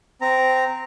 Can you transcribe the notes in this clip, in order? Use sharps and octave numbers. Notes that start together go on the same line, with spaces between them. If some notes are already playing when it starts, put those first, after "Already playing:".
C4 A#5